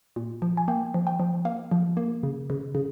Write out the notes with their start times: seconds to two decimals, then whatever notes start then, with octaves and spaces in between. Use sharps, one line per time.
0.16 A#2
0.42 F3
0.57 G#5
0.68 A#3 G5
0.94 F3
1.07 G5
1.20 F3
1.45 A#3 F5
1.72 F3
1.97 A#3
2.23 C#3
2.50 C#3
2.75 C#3